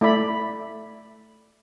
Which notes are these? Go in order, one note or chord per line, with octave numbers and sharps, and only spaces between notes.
A3 E4 D5 B5